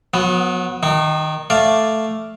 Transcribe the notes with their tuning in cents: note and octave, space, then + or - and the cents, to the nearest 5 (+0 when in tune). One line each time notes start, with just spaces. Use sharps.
F#3 -35 B3 +0
D#3 +0 D#4 -45
A3 +0 D5 +0 F5 +0